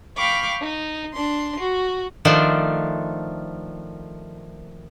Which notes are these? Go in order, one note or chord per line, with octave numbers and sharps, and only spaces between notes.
F5 G5 B5 C#6 D6 F6
D#4
D4 C6
F#4
D#3 F3 A3 D4 C5